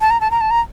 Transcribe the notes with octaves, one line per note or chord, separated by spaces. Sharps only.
A5
A#5
A5
A#5
A5
A#5